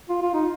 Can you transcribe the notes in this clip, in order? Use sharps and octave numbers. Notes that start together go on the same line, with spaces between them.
F4
F4
D#4